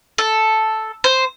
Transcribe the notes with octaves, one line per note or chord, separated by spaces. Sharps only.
A4
C5